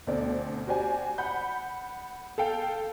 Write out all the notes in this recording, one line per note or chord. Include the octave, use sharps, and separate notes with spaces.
D2 B2 A3 C4 D5
F#4 G4 C5 D5 G#5
F#5 B5 G6
A4 F5 G5